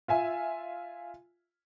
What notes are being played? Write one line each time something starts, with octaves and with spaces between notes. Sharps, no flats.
F4 E5 G#5